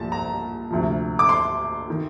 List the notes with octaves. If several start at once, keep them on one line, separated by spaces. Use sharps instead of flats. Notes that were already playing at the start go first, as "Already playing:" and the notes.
Already playing: C2 A#2 F3 A5
A#5
D2 C3 F3
D6
C6
D#3